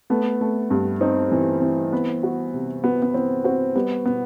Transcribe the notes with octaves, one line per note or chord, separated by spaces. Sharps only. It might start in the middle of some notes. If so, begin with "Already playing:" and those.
A3 B3
A3
G2
C4 D#4
E3
E3
B3
F#4
C3
B3 F#4
B3
E3 C4
C4 F#4
G3 B3
B2 B3